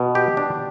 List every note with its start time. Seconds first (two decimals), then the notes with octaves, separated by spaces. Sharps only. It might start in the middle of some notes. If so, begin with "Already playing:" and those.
Already playing: B2
0.15 G4
0.37 D4